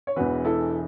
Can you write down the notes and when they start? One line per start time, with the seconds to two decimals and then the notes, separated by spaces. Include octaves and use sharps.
0.07 C#5
0.16 E1 E2 E3 F#4 B4
0.45 E4 A4